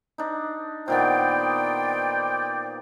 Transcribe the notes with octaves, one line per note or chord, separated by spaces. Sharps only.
D4 D#4
A#2 D#3 B3 C5 D5 G5